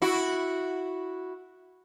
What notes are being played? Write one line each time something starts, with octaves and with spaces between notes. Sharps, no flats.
E4 F#4